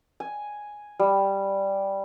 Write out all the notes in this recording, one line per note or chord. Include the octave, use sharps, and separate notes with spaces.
G#5
G3